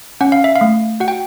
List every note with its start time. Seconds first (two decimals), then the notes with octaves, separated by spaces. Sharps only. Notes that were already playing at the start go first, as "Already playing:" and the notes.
0.21 C#4 F#5
0.32 F5
0.44 E5
0.56 F5
0.61 A3
1.00 F#4 F#5
1.08 G5